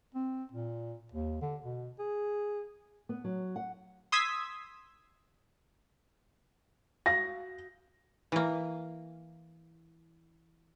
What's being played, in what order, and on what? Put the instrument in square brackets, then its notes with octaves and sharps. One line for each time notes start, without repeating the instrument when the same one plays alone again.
[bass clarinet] C4
A#2
D#2
D3
B2
G#4
[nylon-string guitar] B3
F#3
F#5
[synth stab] C6 D#6 E6 G#6 B6
[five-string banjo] F#4 F5 [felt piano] A#6
[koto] E3 A#3